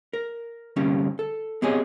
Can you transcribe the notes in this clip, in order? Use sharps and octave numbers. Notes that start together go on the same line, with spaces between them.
A#4
D2 G2 C3 G3 A#3 C#4
A4
B3 C4 G4 G#4 C#5 D#5